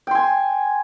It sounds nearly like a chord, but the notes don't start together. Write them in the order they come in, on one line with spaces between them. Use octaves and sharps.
G5 C6 G#5